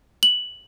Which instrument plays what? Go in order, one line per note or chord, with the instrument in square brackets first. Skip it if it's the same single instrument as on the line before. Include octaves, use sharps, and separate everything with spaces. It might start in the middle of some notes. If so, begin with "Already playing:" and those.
[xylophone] F#7